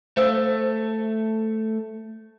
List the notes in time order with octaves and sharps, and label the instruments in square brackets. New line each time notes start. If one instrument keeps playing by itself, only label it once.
[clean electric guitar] A3 [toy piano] C5 F5 E6